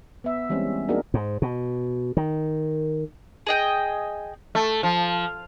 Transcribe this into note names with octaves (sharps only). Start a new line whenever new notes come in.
B3 E5
E3 G3 G#3 C4 C#4
A#3 D4 D#4 F#4 G#4 A#4
G#2
B2
D#3
G#4 D#5 G5
A3
F3